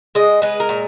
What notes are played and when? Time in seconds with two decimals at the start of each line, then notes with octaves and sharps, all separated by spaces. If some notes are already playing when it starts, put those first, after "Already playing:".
0.15 G#3 D#5
0.42 G#3 B4
0.60 A#4
0.69 A#2